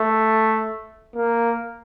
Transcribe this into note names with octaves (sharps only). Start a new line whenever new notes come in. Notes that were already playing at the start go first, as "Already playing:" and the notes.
Already playing: A3
A#3